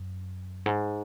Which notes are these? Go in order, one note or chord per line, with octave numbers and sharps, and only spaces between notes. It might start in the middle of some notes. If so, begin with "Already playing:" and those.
Already playing: F#2
G#2